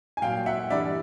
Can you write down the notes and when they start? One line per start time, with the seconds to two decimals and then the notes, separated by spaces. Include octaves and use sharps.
0.17 G#5
0.22 A#2 F5 G5
0.25 F#3
0.46 E5 F#5
0.70 G2 E3 G3 D5 E5